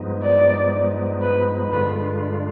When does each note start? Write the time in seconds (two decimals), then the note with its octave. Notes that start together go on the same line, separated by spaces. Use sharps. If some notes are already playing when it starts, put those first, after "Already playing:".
Already playing: G2 F3 G#3 B3 D#4
0.23 D5
1.21 B4
1.72 G2 D3 G#3 D4 F4 B4